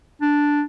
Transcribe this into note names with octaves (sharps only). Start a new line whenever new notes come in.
D4